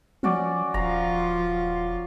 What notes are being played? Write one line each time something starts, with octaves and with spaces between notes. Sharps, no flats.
F3 C#4 F#4 D5
D#1 F3 F4 A#5